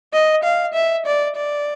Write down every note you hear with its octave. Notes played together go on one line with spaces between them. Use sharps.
D#5
F5
E5
D5
D5